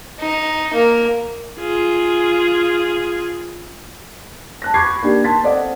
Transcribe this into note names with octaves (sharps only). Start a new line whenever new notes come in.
D#4
A#3
F4 G#4
A5 F#6 A#6
B5 C#6 D6 G6 G#6 C7
A#3 D4 D#4 G4
A5 C6 A6 B6
C4 A4 D5 D#5 F5 F#5